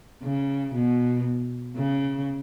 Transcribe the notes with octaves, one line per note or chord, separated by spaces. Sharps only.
C#3
B2
C#3